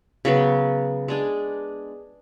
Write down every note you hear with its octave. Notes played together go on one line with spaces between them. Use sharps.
C#3 F#3 B3
G#3 D4 G#4